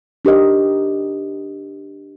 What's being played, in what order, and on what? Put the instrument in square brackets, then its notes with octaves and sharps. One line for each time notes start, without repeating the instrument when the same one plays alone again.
[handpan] D4 G4 A#4 D#5